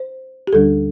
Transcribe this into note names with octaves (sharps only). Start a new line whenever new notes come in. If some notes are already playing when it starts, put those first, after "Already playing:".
Already playing: C5
G4
D2 D3 G3 D4 A4